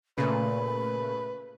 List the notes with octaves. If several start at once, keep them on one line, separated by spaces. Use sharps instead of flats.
A#2 C#3 A3 B4 B5